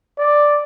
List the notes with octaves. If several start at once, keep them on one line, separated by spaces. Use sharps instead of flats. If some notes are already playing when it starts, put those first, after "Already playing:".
D5